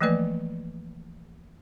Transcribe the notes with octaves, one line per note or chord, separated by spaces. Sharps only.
E3 F3 A3 A#3 B4 D5